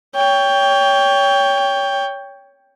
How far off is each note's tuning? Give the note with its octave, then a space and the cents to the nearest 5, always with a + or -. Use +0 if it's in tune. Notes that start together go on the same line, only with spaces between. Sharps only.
C#5 +25 G5 +10